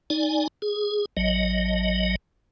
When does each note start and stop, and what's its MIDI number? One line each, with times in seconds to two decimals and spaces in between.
0.10 0.48 63
0.10 0.48 74
0.10 0.48 80
0.62 1.05 68
1.17 2.16 33
1.17 2.16 54
1.17 2.16 75